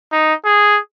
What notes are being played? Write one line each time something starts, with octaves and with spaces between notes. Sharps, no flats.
D#4
G#4